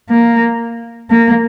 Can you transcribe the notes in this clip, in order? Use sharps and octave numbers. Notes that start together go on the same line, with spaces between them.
A#3
A#3